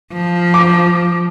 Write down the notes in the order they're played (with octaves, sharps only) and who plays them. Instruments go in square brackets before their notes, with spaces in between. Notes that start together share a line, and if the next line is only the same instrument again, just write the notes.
[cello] F3
[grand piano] D6